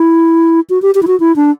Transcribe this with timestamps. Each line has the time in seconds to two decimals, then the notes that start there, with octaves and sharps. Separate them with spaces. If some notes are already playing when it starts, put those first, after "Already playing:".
Already playing: E4
0.70 F#4
0.82 G4
0.95 G4
1.03 E4
1.07 F#4
1.20 E4
1.36 D4